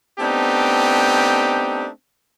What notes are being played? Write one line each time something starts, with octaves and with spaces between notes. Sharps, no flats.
A3 B3 C4 D4 D#4 G4